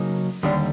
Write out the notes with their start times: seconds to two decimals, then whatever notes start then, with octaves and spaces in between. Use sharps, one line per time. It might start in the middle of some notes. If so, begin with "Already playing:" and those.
Already playing: C#3 F#3 A#3 D#4
0.43 D#2 D3 G3